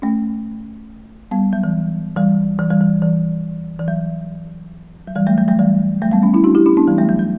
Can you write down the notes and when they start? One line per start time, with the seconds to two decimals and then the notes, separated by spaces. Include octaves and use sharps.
0.02 A3 C#4
1.31 G3 B3
1.53 F#3
1.64 E3
2.16 E3 G3
2.59 E3
2.70 E3 G3
2.81 E3
3.02 E3
3.80 E3
3.88 F#3
5.07 F#3
5.15 E3 G3
5.27 F#3 A3
5.38 F#3 A3
5.48 F#3 A3
5.59 E3 G3
6.02 F#3 A3
6.12 G3 B3
6.22 A3 C#4
6.34 C#4 E4
6.44 D4 F#4
6.55 E4 G4
6.66 C#4 E4
6.77 B3 D4
6.88 E3 G3
6.98 F#3 A3
7.09 F#3
7.19 F#3